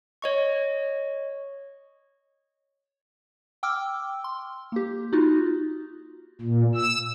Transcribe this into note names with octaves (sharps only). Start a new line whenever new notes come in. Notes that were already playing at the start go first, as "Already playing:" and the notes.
C#5 D#5 C#6
G5 D6 E6 F6
C6
A#3 G4
D#4 F4 F#4
A#2
E6